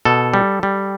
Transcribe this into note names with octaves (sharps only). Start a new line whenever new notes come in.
B2 A4
G3
G3